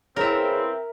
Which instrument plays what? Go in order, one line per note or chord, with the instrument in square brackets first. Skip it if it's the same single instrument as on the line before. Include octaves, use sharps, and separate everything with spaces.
[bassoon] C#3 [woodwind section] C4 [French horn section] E4 B4 [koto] A#4 E5